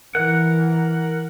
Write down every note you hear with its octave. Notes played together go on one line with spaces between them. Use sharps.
E3 A#4 F#5